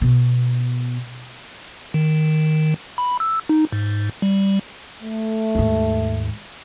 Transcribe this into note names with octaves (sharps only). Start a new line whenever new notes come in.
B2
D#3
B5
E6
D#4
G#2
G3
A3
D#2 G#2